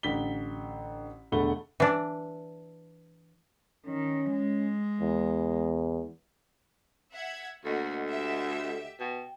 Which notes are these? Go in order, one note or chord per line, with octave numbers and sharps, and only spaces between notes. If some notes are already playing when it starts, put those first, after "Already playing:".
A1 D3 B6 G7
E1 D3 A3 F#5 B5 G7
E3 D4
D#3 C#4
G#3
E2
E5 F#5 G#6
D2 A#3 F#4 A4 D#5 F#5
G4 E5
B2 G5